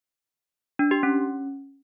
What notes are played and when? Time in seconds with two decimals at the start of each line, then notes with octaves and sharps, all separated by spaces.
0.79 D4
0.91 G4
1.03 C#4